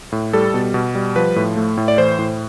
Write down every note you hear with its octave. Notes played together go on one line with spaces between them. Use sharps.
A2
G3 A4
B2
B2
G3
F3 B4
A2
A3
A2
D5
E3 C5
A2